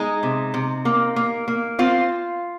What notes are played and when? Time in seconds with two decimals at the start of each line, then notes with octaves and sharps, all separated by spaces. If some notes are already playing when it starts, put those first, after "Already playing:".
Already playing: G#3 D#4
0.23 C3
0.54 C3
0.85 A#3
1.16 A#3
1.48 A#3
1.79 C4 F4